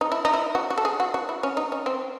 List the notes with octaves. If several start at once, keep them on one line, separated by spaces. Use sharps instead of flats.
D#4
E4
D#4
E4
F#4
F#4
A4
G#4
F#4
F#4
E4
C#4
D#4
C#4
C4